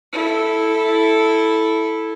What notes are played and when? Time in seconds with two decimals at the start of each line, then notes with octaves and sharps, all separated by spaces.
0.13 E4 A4